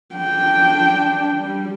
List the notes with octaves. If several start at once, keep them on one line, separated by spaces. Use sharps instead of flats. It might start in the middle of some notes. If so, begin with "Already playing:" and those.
D4 G5
G3